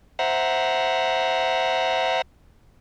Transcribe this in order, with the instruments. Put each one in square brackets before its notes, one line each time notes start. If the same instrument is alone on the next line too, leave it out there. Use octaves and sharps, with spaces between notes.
[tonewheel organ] C5 E5 F#5 A#5